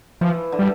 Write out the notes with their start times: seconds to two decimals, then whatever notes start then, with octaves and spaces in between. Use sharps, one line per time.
0.21 E3 F3
0.52 D3
0.59 G3